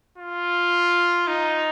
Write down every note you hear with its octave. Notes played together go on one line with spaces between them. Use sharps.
F4
D#4